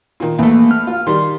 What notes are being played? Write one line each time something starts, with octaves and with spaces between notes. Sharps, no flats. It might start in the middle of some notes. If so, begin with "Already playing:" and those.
A#2 D#3
E2 A3 A#3
F6
F4
D#3 G3 C6